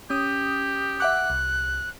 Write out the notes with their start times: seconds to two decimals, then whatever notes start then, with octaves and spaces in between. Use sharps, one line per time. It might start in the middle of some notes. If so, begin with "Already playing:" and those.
0.10 C#4 G4 D#6
1.00 E5 F#5 D6 F#6
1.30 C2